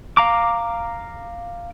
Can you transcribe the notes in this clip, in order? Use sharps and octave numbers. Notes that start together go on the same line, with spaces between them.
F5 A#5 D6